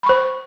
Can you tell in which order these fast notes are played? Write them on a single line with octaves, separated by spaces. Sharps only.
B5 C#6 C5